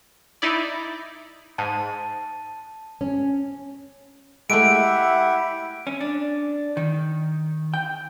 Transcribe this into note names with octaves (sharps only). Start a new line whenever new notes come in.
D#4 E4 D5
G#2 A5
C#4
G#3 A3 E4 G4 E5 F#5 D7
C#4
D4
D#3
G5